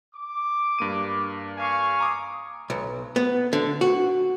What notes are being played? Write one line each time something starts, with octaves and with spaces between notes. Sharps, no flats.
D6
G2 A#3 D#7
F5 G#5 C#6
A#5 D6 D#6
B1
B3
D3
F#4